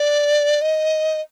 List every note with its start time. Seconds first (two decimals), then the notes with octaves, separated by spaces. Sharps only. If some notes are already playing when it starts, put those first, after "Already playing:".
Already playing: D5
0.62 D#5